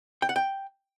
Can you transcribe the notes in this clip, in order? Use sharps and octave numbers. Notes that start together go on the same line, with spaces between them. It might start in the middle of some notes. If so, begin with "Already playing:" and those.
G5
F#5
G5